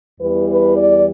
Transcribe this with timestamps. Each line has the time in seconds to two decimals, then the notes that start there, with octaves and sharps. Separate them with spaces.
0.20 E2 E3 G3 B4
0.49 B4
0.77 D5